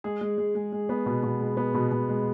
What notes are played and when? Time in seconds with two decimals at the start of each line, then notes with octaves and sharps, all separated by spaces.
0.04 G#3 G#4
0.21 G#3
0.38 G#3
0.55 G#3
0.72 G#3
0.89 B3
1.06 B2
1.23 B2
1.40 G#3
1.57 B3
1.74 B2
1.92 B2
2.09 G#3